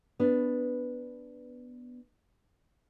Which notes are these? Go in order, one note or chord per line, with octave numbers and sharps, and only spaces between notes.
B3 D4